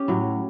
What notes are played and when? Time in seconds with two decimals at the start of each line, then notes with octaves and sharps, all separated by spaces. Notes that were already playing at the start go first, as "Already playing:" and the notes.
Already playing: C#4 G4
0.08 A2 F#3